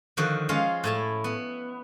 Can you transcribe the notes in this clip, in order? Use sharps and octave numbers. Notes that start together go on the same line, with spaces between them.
D3 D#3 F3 F#4
G#3 C#4 F4 F5
A2 E4 A5
B3